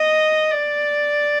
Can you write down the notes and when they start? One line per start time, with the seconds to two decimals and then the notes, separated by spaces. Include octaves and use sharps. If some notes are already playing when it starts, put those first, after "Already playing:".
Already playing: D#5
0.51 D5